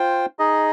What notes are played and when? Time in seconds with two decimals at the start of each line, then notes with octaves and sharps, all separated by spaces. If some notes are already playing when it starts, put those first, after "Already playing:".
Already playing: F4 C5 G5
0.39 D#4 G#4 D#5